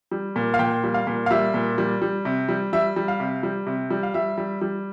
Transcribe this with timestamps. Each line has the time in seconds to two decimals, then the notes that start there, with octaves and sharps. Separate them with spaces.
0.11 G3
0.36 A#2
0.54 F5
0.59 A#2 G5
0.84 G3
0.94 F5
1.07 A#2
1.26 F5
1.30 G3 E5
1.54 A#2
1.78 G3
2.02 G3
2.25 C3
2.48 G3
2.73 G3 E5
2.96 G3
3.08 F5
3.20 C3
3.43 G3
3.67 C3
3.90 G3
4.03 F5
4.14 G3 E5
4.38 G3
4.61 G3